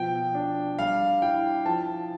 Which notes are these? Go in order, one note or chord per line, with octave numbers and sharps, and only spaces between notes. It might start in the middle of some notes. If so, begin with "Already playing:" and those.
Already playing: B2 F3 G5
D4
G3 F5
E4 G5
F3 A5